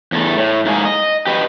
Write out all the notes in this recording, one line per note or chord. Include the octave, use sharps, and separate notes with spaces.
E2 A3
A2
G#2 A#3 G#4
D#5
G4 B4 D#5